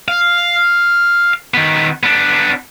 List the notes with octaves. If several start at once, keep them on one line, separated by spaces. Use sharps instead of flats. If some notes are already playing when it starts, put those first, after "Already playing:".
F5
D#3 B3
B3 D4